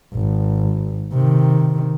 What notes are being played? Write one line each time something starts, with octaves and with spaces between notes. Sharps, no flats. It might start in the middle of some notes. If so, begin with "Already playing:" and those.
G#1
C3 D#3